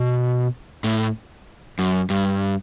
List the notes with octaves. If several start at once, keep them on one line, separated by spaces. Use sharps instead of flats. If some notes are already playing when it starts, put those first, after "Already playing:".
Already playing: B2
A2
F#2
G2